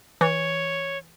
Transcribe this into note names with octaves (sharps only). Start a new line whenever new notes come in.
E3 C#5